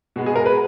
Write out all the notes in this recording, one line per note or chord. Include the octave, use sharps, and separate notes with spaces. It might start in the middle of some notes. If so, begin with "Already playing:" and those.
B2 G#3 B3
G#4
A#4
B4